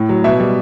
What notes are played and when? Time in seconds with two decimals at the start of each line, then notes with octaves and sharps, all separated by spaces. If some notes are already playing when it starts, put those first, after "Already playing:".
Already playing: A2
0.09 F#3
0.24 B2 E5
0.40 G3